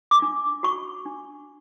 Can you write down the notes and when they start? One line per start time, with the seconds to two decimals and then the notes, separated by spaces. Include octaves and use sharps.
0.11 D6
0.22 D4
0.63 F#4 C#6
1.06 D4